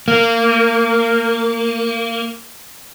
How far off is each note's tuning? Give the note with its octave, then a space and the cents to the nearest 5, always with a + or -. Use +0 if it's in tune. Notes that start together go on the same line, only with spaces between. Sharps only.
A#3 -20